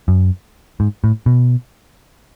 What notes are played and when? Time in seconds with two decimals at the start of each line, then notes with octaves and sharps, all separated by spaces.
0.08 F#2
0.80 G#2
1.04 A2
1.26 B2